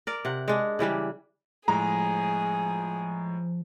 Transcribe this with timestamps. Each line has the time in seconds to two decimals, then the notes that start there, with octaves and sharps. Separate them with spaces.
0.07 A#4 D5
0.25 C3 F#5
0.48 G#3 D4
0.79 C#3 E3 G3 D4
1.68 A2 F3 G#3 G#4 A#5